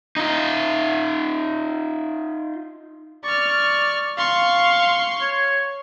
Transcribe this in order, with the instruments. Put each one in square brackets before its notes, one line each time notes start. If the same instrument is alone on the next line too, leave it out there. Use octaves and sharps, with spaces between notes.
[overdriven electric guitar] D#4 F4
[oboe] D5 [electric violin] C#6 F6
[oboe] F5 [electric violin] C6 C#6
[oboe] C#5